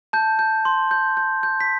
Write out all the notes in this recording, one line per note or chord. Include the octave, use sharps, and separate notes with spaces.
A5 G6
G6
C6
G6
G6
G6
B6